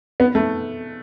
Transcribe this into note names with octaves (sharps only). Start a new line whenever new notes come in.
B3
A3